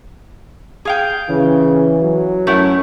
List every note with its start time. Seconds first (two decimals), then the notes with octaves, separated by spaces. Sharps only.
0.85 G#4 F5 G5
1.29 C#3 E3
2.02 F#3
2.47 F#2 A3 E4 F#5